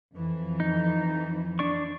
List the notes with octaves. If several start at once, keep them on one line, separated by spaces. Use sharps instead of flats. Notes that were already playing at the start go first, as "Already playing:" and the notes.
F2 E3
D#4
D4 D5 C#6